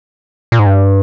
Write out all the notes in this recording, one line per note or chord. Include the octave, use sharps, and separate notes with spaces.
A#2
G#2
G2